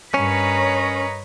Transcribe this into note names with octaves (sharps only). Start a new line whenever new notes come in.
G2 C#4 A#4 B4 C#5 D#5 A#5